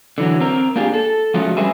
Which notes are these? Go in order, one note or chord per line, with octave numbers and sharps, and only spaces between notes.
D3 E3 F#3
C4 A#4
A#3 D4 F4 G4 G#4
A4
F3 G#3 A3 C#4 F4 F#4
G3 G#3 C#4 G#4 B4 E5